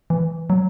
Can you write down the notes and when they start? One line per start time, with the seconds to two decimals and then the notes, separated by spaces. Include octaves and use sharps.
0.10 E3
0.50 F#3